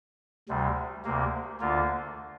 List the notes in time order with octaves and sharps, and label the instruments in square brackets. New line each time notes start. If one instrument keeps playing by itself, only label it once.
[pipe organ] D2 C3 G3
D2 C3 A#3
D2 D3 A#3 F4